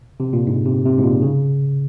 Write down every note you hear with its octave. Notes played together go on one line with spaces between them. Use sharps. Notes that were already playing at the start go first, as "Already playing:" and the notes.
C3
A#2
G#2
C3
C3
G#2
A#2
C#3